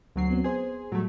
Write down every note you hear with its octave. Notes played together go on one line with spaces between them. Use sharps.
D2 F#3 C7
B3 C4
B3 G#4 C5
A2 F#3 G3 A3